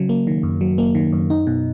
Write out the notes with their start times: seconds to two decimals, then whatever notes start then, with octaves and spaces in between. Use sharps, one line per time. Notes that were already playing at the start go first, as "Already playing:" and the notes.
Already playing: C#3 F#3
0.09 A#3
0.27 D#3
0.43 F#2
0.61 F#3
0.78 A#3
0.95 D#3
1.12 F#2
1.30 D#4
1.47 B2